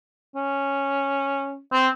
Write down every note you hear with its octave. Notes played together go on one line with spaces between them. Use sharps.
C#4
C4